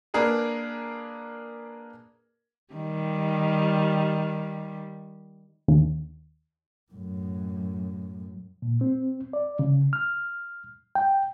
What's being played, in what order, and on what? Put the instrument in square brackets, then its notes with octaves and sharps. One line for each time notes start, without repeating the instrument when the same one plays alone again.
[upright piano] A#3 D4 G#4 A#4 B4
[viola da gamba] D#3 G3
[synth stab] D#2
[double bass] F#2 A2
[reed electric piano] A#2
C4
D5
C#3
F6
G5